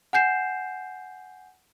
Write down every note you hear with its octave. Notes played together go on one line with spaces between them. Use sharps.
F#5 G#5 G6 C7 E7